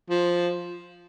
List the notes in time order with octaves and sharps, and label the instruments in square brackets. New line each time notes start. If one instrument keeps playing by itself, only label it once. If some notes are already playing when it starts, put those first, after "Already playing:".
[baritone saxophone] F3